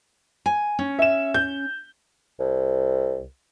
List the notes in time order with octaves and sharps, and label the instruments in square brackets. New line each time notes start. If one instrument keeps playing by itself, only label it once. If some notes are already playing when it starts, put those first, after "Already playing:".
[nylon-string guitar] G#5
C#4
[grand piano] E5 E7
G6
[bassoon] C2